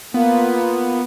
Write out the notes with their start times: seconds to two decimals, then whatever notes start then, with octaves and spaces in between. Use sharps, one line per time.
0.14 A#3 B3 F4